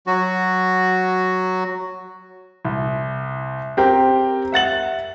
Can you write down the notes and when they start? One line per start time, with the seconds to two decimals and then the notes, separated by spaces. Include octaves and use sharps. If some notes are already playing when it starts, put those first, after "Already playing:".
0.07 F#3 F#4
2.65 C2
3.77 C4 G4 A#4
4.52 E5 F#5 A6 F#7